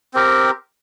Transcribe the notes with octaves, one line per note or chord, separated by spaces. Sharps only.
C4 G4 A#4